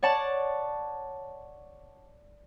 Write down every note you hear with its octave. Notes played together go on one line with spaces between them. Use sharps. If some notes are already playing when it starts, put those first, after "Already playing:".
C#5 D5 F#5 A5